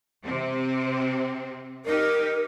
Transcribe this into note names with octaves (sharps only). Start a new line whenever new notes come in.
C3 C4
D#4 G4 A#4